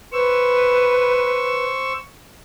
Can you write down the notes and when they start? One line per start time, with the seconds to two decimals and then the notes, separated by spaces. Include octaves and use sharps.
0.12 B4 C5 C#6 E6